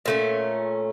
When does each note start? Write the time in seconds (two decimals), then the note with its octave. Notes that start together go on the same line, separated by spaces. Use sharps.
0.06 A#2 A3 C#4